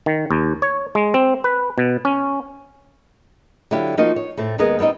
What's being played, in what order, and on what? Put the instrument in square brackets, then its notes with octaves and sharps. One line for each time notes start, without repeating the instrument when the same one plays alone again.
[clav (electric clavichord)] D#3
D#2
C#5
G#3
C4
B4
B2
C#4
[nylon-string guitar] D3 F#3 E4 G4 F5
F3 A#3 D#4 F#4 C5 D#5
C#5
A2 A3 C4
D#2 G#3 B3 G#4 A#4 D#5
G3 B3 C4 D#4 D#5